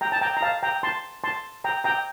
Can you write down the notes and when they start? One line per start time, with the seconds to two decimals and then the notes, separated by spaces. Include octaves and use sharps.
0.01 G5 A#5
0.12 A5
0.21 G5 A#5
0.37 A#5
0.42 F5 A5
0.63 G5 A#5
0.83 A5 C6
1.24 A5 C6
1.64 G5 A#5
1.84 G5 A#5